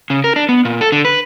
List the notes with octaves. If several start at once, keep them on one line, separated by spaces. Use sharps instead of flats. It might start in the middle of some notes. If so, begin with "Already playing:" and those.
C#3
A#4
D4
B3
A#2
A4
D3
B4